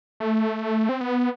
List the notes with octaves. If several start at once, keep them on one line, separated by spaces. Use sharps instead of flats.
A3
C4
B3